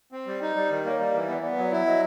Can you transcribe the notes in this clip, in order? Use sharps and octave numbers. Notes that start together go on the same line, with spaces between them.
C4
G3
D#4
G3 D5
D#3
A#3 C#5
G3 D5
E3
B3
B3 D5
F#3
D5
E4
F#3 D#5